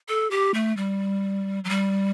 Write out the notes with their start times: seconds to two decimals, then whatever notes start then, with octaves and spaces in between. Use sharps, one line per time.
0.08 A4
0.31 G4
0.54 A3
0.77 G3
1.64 F#3
1.69 G3